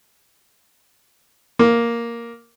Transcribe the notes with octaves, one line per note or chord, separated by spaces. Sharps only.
A#3